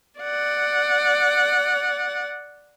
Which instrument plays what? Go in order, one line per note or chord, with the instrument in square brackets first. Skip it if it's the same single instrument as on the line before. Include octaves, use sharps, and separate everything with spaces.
[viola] D5 F#5